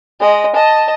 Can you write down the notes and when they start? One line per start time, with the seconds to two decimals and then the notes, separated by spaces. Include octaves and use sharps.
0.20 G#3 D#5
0.55 D#5 A5